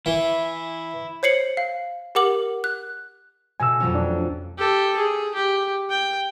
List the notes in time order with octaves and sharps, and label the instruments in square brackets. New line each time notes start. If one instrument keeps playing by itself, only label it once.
[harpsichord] E3 [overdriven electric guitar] E4
[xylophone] C5 C#5 C7 C#7 F#7
F5
G4 A#4 F#5 D6 F#7
F#6
[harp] B2 A3 [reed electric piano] G#5 E6
[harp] F2 F#3 C#4
[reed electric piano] D4
[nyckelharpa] G4 A4
G#4
G4
G5